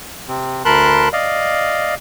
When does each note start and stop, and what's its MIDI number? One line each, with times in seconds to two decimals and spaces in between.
0.28 0.63 48
0.28 0.63 60
0.65 1.09 38
0.65 1.09 70
0.65 1.09 81
0.65 1.09 83
0.65 1.09 84
0.65 1.09 90
1.13 1.95 74
1.13 1.95 75
1.13 1.95 77